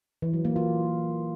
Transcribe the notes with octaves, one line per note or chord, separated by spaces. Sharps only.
E3
F#3
A#3
F4